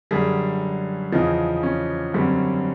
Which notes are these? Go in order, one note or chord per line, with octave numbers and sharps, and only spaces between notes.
F#2 D3 G3 G#4
E2 C#3 F3 D#4
C#4
F#2 D3 G3 C4